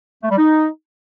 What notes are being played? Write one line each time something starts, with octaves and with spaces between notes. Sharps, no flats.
A3
G3
D#4